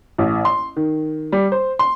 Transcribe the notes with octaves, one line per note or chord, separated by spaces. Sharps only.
A1
C6
D#3
G3
C5
C6